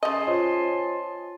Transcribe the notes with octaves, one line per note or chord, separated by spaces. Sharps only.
C#3 D#5 G#5 A5 C6
F4 C5 C#5